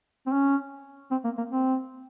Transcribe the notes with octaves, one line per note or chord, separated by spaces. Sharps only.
C4
C#4
C4
A#3
A#3
C4